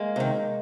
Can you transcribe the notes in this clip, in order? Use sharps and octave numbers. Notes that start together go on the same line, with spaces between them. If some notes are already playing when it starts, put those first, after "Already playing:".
Already playing: G#3 A#3
C3 D#3